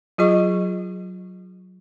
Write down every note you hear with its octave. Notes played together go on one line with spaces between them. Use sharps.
F#3 F4 G#4 D#5 C#6